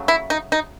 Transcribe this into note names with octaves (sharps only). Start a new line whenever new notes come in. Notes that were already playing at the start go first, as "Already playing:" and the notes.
Already playing: C#3 F#3 A3
E4
D#4
D#4